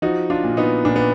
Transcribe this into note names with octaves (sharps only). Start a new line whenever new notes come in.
F3 D#4 F#4
D4 F4
A#2
B3 D#4
A#2 D4
B3